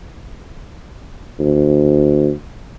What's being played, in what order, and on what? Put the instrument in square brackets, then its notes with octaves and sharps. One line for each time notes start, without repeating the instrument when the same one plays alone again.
[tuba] D2